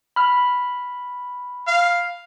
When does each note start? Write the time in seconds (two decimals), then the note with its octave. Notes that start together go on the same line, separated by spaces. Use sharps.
0.16 B5 F6
1.67 F5